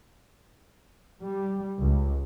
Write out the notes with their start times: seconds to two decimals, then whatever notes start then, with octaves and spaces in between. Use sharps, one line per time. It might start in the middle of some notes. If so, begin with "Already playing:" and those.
1.23 G3
1.79 C#2